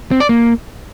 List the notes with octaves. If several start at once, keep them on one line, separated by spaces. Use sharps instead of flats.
C4
D5
A#3